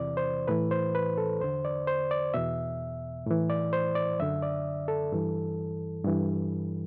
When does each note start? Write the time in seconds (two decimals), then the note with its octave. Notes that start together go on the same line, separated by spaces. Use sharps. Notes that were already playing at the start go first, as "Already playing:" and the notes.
Already playing: E2 C3 E3 D5
0.17 C5
0.48 A2 E3 B4
0.71 C5
0.95 B4
1.18 A4
1.40 E2 D3 C5
1.65 D5
1.87 C5
2.11 D5
2.34 E2 B2 E5
3.26 A2 E3
3.50 D5
3.73 C5
3.95 D5
4.19 F#2 D3 E5
4.43 D5
4.88 A4
5.12 G2 E3
6.05 G2 E3